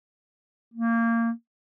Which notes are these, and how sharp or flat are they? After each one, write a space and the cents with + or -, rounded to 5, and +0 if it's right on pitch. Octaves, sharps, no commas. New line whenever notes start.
A#3 -20